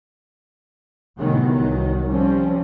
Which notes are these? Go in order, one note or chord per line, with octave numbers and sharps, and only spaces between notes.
A2 C3 D#3 E3 F#3 B3
C2 D#3 F#3
F3 G3 C4 C#4